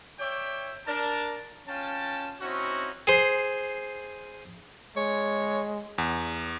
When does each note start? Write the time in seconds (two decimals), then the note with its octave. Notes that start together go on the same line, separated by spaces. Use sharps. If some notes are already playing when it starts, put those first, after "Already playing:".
0.19 C#5 D5 E5 G5
0.87 D4 A#4 A5
1.68 C#4 F4 G5 A5
2.40 C4 C#4 D#4 E4 F#4
3.07 G#4 C5
4.96 G#3 C#5
5.98 E2